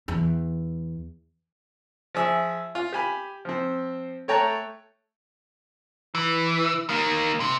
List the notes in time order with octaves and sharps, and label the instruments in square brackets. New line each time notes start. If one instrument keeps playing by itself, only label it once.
[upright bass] E2
[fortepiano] F3 G#4 E5
F4
G4 G#5 B5
F3 C4
A3 C#5 G5 A5 A#5 F#6
[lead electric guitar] E3
D#3 A#3
C3